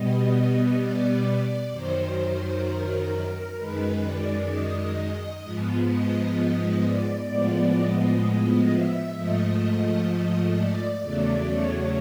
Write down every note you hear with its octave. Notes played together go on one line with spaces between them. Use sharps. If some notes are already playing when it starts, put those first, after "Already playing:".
Already playing: B2 G3 B3 D#5
D5
F#2 D#3 F#3 C5
A#4
F#2 D#3 G#3 B4
D5
D#5
G#2 F3 G#3 B3
D#5
D5
A2 F3 G#3 B3
D#5
E5
G#2 F3 A3 D#5
D#5
D5
E2 C#3 F#3 A3
C#5